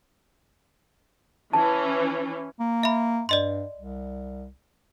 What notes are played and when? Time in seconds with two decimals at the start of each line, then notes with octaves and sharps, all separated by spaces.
1.53 E3 C#4 A5
2.60 A#3
2.83 E5 B5
3.29 G2 D5 D#5 C6
3.76 C2